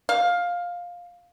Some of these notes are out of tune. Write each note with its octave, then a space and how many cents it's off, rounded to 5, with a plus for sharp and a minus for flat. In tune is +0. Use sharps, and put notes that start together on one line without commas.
F5 +10